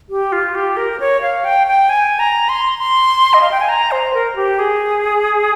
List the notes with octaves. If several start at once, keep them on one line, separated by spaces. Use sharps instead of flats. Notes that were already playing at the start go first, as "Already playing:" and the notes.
G4
F4
G4
A#4
C#5
F5
G5
G5
G#5
A#5
C6
C6
D#5
F5
G5
G#5
A#5
C5
A#4
G4
G#4